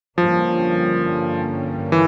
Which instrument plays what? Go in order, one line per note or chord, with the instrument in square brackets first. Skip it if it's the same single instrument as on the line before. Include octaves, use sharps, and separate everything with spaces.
[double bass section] G2 D3 G3 A#3 C#4 [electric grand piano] F3
[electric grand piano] E3